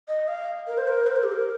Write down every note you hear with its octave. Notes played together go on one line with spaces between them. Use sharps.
D#5
F5
A#4
C5
A#4
C5
A#4
G4
A#4